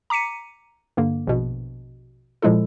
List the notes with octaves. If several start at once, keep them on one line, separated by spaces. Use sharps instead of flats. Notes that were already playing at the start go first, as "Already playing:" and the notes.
A#5 D6 B6 C#7 D#7
G2 D3 A#3
A#1 B2
A#2 F3 G#3 E4 A4